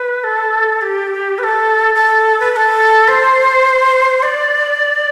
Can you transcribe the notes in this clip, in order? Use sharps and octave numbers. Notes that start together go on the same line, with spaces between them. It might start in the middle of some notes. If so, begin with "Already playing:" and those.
Already playing: B4
A4
G4
B4
A4
A4
B4
B4
A4
C5
D5